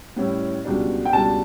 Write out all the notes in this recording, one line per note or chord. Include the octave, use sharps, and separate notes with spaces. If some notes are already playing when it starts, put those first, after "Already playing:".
A2 G3 C#4 E4
C#2 B2 G3 D4
G5
C#2 B2 G3 D4 A5